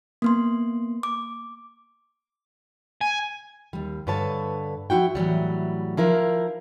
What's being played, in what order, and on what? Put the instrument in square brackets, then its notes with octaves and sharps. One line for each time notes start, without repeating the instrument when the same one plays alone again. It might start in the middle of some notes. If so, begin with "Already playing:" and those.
[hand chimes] A#3 B3 C6
D6
[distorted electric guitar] G#5
[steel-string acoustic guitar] D#2 G3
G2 D3 B4 C#5 A5
F3 E4 F#4 G5
A2 E3 F#3 G3
F3 E4 A#4 F5